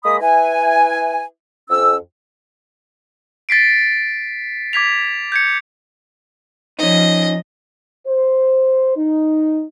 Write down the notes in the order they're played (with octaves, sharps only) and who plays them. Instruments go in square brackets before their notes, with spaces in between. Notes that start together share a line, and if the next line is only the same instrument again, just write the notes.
[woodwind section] G#3 A#3 D#5 B5 D#6
E4 B4 G#5
F2 C#4 E6
[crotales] A6 B6 C7 D7
D6 G#6 B6 F7
G6 G#6 C#7
[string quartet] F3 [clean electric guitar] C#4 D#4 [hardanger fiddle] D#5
[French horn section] C5
D#4